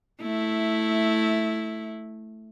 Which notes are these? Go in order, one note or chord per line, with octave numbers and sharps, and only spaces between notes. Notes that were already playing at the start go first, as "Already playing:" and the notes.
A3 E4